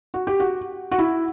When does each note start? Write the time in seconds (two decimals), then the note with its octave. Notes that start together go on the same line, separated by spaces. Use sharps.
0.14 F#4
0.27 G4
0.40 F#4
0.91 F#4
0.99 E4